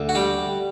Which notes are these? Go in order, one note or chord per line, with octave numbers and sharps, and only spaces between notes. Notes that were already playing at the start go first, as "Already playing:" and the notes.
Already playing: D2
F#4
G3 G4